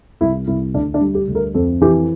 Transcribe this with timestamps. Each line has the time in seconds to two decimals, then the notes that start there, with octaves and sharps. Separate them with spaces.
0.21 C2 E4
0.47 C2 E4
0.74 D2 D4
0.94 D4
1.01 G3
1.15 G4
1.28 D2
1.35 A#4
1.55 F2 A4
1.81 E3 G4